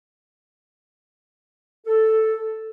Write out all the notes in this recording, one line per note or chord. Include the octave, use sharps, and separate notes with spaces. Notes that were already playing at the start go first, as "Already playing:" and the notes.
A4